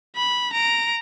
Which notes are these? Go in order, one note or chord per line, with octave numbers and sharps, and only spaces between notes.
B5
A#5 D7